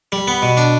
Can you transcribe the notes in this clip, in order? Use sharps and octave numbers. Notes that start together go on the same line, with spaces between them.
G3
B3
B2
D4